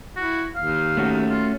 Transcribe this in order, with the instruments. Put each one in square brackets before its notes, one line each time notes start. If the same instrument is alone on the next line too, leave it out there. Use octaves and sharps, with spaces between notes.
[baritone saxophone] E4 [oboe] F#4
[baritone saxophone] D#2 [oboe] F5
[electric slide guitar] A3 C#4 F#4
[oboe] F4